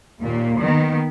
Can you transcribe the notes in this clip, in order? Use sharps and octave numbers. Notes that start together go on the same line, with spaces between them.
D#2 A#2 A#3
D#3 B3